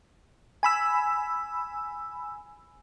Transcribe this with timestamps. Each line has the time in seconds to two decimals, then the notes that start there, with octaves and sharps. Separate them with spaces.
0.63 G#5 B5 E6